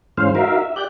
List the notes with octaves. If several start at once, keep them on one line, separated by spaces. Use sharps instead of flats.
G#2 E3 G#3 C#4 C5 F5
D#4 F#4 A#4 E5 F5
E5
G4 D5 F#6 G6